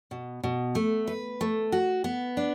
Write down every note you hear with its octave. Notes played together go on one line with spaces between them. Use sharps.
B2
B2
A3
B4
A3
F#4
B3
D4